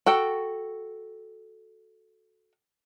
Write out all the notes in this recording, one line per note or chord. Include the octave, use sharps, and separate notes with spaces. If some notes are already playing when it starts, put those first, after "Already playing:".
F#4 A4 G5